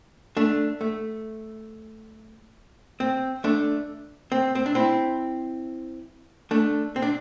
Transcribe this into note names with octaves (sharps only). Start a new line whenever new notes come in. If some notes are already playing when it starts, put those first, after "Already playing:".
A3 D4
A3
C4
A3 D4
C4
C4
D4
C4 E4
A3 D4
C4
D4